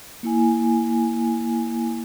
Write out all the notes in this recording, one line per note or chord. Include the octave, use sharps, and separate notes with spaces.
A#3 E4 G#5